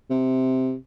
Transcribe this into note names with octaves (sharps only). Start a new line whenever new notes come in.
C3